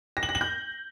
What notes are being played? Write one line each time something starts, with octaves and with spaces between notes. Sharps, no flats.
A#6
F#7
A#6
F#7
G6